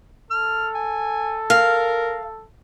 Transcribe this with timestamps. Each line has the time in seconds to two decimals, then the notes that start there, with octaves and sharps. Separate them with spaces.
0.30 A4 F6
0.75 G#5
1.50 A#4 F5